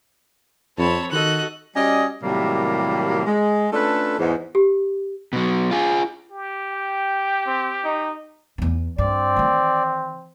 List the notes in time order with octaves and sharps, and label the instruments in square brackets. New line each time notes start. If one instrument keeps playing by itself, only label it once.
[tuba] F2 [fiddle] C4 C#5 [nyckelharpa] A5 B5
[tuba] D#3 [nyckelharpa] F#4 A4 [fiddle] D#5 F#6
[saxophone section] G3 C#4 F#4 D5 D#5
A2 C3 D#3 F#3 G3 A#3
G#3
A3 C#4 D4 F4 A4 B4
E2 G#2
[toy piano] G4
[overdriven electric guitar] B2 F#3
F4 G#4
[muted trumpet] G4
[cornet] G5
C4
D#4
[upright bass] E2 B3
[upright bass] G2 [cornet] C4 [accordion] D5
[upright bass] D#3 E3